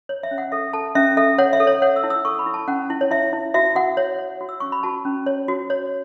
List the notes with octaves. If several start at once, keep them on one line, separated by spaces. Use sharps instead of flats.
C#5
E5
C#4
F#5
A4 E5
A4 A5
C#4 E5
A4 E5
C#5 F#5
E5
A4
C#5
C#5 F#5
E6
E4
E6
A4 C#6
B5
E4
A5
C#4 F#5
E4
C#5
E4 E5
E4
F#4 E5
F#4 F#5
C#5
C#5
F#4
E6
C#4 C#6
B5
F#4 A5
C#4
C#5
F#4
C#5